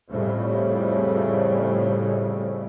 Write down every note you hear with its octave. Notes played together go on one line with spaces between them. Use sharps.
F2 A2 C#3 G3